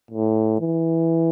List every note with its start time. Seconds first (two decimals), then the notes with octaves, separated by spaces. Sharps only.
0.11 A2
0.60 E3